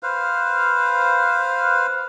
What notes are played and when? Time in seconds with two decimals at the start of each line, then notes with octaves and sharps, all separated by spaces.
0.03 B4 C5 F5